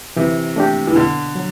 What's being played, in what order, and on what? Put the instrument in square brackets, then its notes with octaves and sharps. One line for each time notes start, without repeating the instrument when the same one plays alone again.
[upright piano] C3 [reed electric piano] E3
[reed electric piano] A3 D4 G4
[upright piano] E3
[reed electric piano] B2 [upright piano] D3
[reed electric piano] F#3